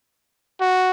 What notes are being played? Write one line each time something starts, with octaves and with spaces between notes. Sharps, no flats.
F#4